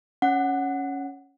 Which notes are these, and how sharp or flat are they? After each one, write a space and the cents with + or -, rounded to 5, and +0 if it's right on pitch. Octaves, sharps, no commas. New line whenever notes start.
C#4 +0 F#5 +0